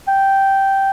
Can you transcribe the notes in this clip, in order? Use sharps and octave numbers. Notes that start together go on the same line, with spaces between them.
G5